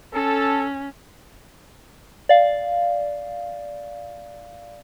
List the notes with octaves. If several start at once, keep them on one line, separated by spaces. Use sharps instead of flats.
C#4 A4
D5 F5